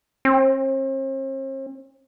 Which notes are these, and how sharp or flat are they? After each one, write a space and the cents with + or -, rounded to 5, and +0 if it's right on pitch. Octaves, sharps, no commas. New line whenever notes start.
C4 +45